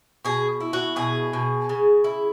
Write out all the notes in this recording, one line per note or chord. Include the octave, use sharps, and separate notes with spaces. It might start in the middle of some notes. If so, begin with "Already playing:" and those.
B2 G#4
E4
F#4
B2 G#4
B2
C#3
E4